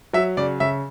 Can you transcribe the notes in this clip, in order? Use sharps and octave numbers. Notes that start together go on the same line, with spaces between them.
F#3 E5
C#3 D5
C#3 E5